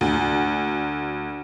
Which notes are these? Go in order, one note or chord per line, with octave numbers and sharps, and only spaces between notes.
D2